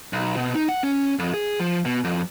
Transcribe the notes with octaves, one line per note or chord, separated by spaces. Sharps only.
B1
B2
D#4
F#5
C#4
F2
G#4
F3
B2
F2